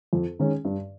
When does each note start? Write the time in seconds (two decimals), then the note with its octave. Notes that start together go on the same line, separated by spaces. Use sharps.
0.13 F2
0.39 D#3 G#3 C#4
0.65 G2